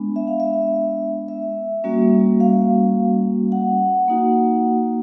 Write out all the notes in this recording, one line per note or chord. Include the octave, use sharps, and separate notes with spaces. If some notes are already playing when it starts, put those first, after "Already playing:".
Already playing: G#3 B3 D4
E5
F5
E5
E5
G3 A#3 C#4 F#4
F5
F#5
A#3 D#4 F#4